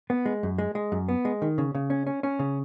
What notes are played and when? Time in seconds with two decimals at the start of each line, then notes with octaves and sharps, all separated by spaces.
0.10 B3
0.26 G#3
0.43 F#2
0.58 G#3
0.75 G#3
0.92 F#2
1.08 B3
1.25 G#3
1.42 D#3
1.58 C#3
1.75 C#3
1.90 C#4
2.07 C#4
2.23 C#4
2.39 C#3